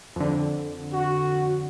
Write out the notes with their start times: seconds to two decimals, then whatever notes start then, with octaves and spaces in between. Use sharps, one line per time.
0.16 F2 D3
0.93 F#4